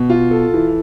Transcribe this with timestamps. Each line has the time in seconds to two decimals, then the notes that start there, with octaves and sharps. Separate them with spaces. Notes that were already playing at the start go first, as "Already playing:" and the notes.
Already playing: B2
0.10 F4
0.31 A4
0.54 E3